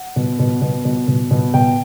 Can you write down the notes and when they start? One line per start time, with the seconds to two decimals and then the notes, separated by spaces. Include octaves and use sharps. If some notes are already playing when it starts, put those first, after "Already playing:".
Already playing: F#5
0.16 B2
0.39 B2
0.61 B2
0.85 B2
1.08 B2
1.31 B2
1.54 B2 G5